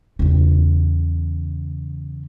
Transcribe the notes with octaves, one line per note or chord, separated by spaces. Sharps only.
E2 C#3